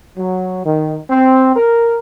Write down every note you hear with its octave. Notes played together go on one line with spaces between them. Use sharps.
F#3
D#3
C4
A#4